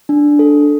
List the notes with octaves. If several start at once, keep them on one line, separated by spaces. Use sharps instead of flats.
D4
A4